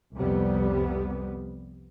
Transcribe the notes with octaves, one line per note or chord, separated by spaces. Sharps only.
C2 F2 C3 G3 B3